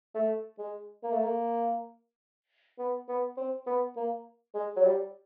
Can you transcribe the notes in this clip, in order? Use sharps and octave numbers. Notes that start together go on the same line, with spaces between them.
A3
G#3
A#3
A3
A#3
B3
B3
C4
B3
A#3
G#3
F#3
G3